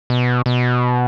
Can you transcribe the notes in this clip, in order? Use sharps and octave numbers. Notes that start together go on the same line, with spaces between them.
B2
B2